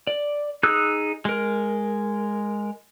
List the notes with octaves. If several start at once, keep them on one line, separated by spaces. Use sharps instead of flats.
D5
D#4 G#4 D#6 E6 F#6
G#3 A#4